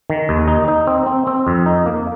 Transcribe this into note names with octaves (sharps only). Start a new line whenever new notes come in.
D#3
D#2
D#4
D#4
C4
C4
C4
F2
D#4
A#3